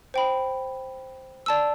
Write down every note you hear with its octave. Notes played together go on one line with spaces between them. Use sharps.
C5 G5 B5
D5 A5 E6